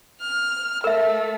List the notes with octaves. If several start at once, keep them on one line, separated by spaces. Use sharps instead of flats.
F6
A3 A#4 E5